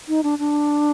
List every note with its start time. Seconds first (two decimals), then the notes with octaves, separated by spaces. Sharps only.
0.08 D#4
0.23 D4
0.39 D4